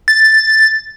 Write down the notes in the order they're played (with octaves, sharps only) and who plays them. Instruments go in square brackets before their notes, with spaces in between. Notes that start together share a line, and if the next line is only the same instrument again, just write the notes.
[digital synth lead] A6